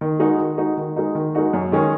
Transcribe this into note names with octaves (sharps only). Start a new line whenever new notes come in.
D#3
G#3 D#4 F#4
D#3
G#3 D#4 F#4
D#3
G#3 D#4 F#4
D#3
G#3 D#4 F#4
F#2
D#3 G#3 C#4